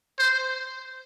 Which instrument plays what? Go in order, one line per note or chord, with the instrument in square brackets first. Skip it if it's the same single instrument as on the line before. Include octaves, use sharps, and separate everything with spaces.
[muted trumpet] C5